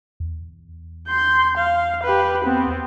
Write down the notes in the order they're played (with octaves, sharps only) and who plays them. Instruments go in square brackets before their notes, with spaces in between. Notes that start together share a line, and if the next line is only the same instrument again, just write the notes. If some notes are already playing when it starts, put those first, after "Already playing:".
[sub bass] E2
[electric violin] C6 G6
F5
G4 B4
B3 C4